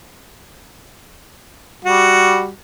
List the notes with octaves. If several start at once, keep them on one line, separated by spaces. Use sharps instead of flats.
G3 F#4